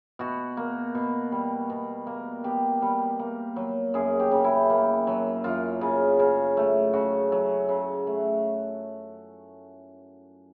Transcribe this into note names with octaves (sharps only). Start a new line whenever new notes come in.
B2 F#4
A#3
B2
G3
B2
A#3
B2 G4
G3
A#3
F#3
F#2 G#4
G4
C#3
E4
A#3
F#3
F#2 F4
C#3
C#3
A3
C#3 F#4
F#3
C#3
A3